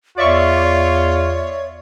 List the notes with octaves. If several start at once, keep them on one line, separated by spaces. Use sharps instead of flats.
E2 F4 C#5 D5 E5 C#6